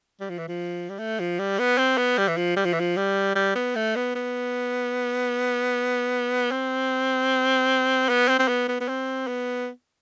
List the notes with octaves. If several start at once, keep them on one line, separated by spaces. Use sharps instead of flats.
G3
F3
E3
F3
G3
A3
F3
G3
B3
C4
B3
G3
E3
F3
G3
F3
E3
F3
G3
G3
B3
A3
B3
B3
C4
B3
C4
C4
B3
B3
B3
C4
B3